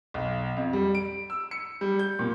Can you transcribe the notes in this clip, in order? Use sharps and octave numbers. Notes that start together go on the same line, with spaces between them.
B1
F2
G3
D7
E6
C#7
G3
G6
A#2